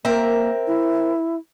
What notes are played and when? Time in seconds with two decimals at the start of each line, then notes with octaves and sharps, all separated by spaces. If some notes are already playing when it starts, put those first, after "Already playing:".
0.05 A#3 C4 A#4 E5
0.67 E4